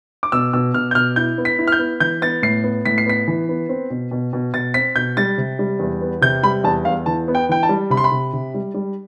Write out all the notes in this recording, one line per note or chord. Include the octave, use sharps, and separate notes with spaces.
D6
B2 E6
B2 E6
B2 F6
G6
B2 F6
E4 G6
B3
B6
E4
F6
G6
B3
E3 G6
B3 A6
A2 C7
B3
A2 B6
C7
B3 B6
E3
B3
C4
B2
B2
B2
B2 A6
C4 B6
B2 G6
G3 A6
C3
G3
E2
B3
C3 G6
G3 B5
E2 A5
E2 F5
E3 A5
B3
G5
E3 G5
A5
G3
C3 B5
C6
B5
C3
C3
G3
G3